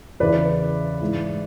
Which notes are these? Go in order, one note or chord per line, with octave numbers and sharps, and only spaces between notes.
E2 C#3 E3 B4 D5
G#2 E3